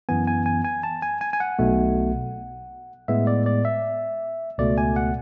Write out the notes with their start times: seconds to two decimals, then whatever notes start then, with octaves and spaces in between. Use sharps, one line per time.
0.09 F#2 E3 B3 G#5
0.27 G#5
0.46 G#5
0.65 G#5
0.83 A5
1.02 G#5
1.21 G#5
1.33 G#5
1.40 F#5
1.59 B1 B2 A3
3.08 A2 G#3 B3 E5
3.27 D5
3.46 D5
3.65 E5
4.58 C#2 B2 A3 D5
4.78 G#5
4.96 F#5